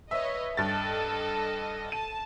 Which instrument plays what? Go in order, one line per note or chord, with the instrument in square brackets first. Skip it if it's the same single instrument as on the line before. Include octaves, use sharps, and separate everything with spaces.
[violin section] B4 C#5 D#5 [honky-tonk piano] E5
[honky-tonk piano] G2 A6 [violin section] A4 D#5
[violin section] A5 [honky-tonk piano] D#7